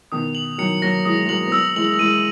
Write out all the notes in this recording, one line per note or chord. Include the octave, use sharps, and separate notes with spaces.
B2 D#3 D#6
F#7
D#3 F#3 C#7
F#3 A#3 A#6
E3 G#3 D#6
G#3
F#3 A#3 F#7
B3
F#3 A#3 E6
E3 G#3 F#7
A#3
E3 G#3 D#7